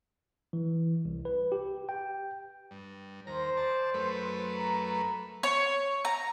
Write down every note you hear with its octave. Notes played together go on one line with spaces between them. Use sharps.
E3
C2
B4
G4
G5
G2
D#2 C5 A#5
D5 A5
F#2 A3 B4
A#5
C#5
A#5